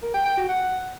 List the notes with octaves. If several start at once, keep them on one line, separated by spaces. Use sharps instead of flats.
A#4
G5
G5
F#4
F#5